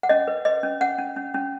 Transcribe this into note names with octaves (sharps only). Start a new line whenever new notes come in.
F#5
C#4 D#5
B4
B4 D#5
C#4
C#4 F#5
C#4
C#4
C#4